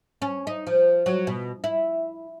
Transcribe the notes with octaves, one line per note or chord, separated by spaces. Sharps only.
C#4
D#4
F3
F#3
B2
E4